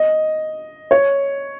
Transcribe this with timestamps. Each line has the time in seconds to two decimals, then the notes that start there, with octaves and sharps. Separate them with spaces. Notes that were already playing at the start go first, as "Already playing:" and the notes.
Already playing: D#5
0.91 C#5